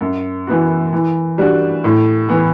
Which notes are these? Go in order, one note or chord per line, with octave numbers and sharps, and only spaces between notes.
F#2
E3 B3 F#4
E3
G3 D4 F#4
A2
E3 B3